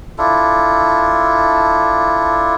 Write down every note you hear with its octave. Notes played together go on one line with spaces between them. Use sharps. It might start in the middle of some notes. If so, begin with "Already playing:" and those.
D4 E4 F4 A4